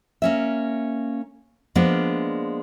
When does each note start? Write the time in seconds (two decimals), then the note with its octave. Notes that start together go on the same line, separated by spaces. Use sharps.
0.22 A#3 C#4 E5
1.75 F3 G#3 A#3 B3 D4